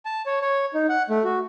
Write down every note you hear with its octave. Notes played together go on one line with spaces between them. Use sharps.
A5
C#5
C#5
D#4
F#5
A3
F#4